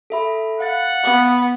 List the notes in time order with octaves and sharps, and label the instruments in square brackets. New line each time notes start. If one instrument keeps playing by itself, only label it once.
[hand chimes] A4 E5 B5
[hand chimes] F5 A6 [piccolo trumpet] F#5
[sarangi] B3